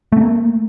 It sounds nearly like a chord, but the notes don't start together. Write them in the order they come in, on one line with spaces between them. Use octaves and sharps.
A3 C4 A#3